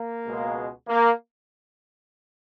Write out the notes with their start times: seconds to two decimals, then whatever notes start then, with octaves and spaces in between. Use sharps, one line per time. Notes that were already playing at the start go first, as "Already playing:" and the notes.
Already playing: A#3
0.25 C#2 B2 G#3
0.88 A#3